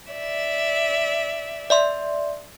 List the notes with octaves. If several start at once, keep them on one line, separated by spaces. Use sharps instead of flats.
D5 E5
D5 E5 C6